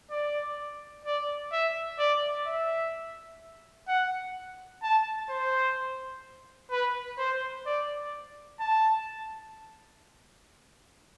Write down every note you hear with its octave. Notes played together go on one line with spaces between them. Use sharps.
D5
D5
E5
D5
E5
F#5
A5
C5
B4
C5
D5
A5